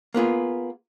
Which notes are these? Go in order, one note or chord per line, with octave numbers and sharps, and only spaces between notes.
A#3 B3 F4 G#4